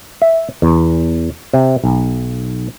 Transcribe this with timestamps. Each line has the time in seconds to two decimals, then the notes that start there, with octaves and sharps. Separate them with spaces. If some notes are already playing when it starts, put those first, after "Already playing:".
0.22 E5
0.62 E2
1.54 C3
1.84 B1